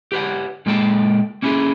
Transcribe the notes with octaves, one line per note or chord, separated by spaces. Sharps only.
G4 B4 C#5 F#5
A#2 G#3 A#3 A4 G5 A5
A#3 C#4 E4 F#4 G#4 A4